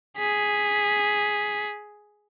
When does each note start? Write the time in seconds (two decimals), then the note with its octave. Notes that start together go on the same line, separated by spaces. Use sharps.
0.18 G#4 B6